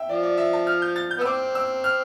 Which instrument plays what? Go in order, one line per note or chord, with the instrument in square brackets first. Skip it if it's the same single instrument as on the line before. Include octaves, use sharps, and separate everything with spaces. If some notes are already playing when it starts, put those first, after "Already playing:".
Already playing: [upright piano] E5 G5
[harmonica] F3 [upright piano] D5
[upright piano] D5
E5
A5
F6
G6
A6
G6
[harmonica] B3
[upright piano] E6
[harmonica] C4 [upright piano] D6
[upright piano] E6
F6